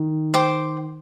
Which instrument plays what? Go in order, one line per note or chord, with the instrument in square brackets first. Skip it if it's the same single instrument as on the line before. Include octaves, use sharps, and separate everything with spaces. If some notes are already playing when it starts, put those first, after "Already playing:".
Already playing: [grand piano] D#3
[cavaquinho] C5 G5 D6